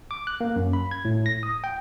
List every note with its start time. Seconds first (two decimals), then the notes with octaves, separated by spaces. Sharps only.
0.11 D6
0.27 F#6
0.41 A#3
0.56 F#2
0.73 B5
0.91 G#6
1.05 A2
1.26 A#6
1.43 D#6
1.64 G5